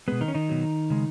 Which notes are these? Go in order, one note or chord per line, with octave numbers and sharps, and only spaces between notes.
B2 G#3 B3
D#3 D#4
C#4
D#3 D#4
B2 F#3
C#3 G#3